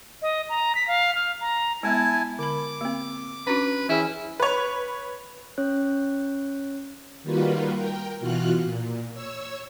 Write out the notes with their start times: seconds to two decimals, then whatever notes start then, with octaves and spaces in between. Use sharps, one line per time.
0.22 D#5
0.49 A#5
0.75 B6
0.88 F5
1.15 F6
1.41 A#5
1.83 G#3 B3 E4 G#5 A5
2.39 D3 B5 D6
2.81 A#3 C4
3.47 C#4 D4 F#4 B4
3.89 E3 C#4 E4 G#4 G5
4.40 B4 C#5
5.58 C#4 C#5 F#6
7.23 D#3 G3 A#3 F4 F#4 B4
7.75 A#4 G5
8.20 B2 E3 F4 F#4 F6 F#6
8.62 A#2
9.14 C#5 E6